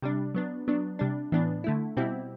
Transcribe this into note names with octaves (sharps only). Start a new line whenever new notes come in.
C3 G3 D4
F#3 B3 D4
F#3 B3 D4
C3 G3 D4
A2 E3 B3 D4
D3 A3 E4
B2 G3 C4 E4